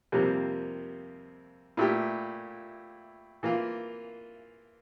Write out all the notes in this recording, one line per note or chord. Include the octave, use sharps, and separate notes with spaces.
F2 C3 G3 A#3
A#2 A3 E4 G4
E3 A#3 F4